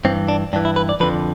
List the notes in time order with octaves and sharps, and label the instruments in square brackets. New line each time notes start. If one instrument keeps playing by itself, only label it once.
[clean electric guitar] G2 E3 C4
D4
G2 D4
E3
E4
B4
D5
F2 D3 F3 B4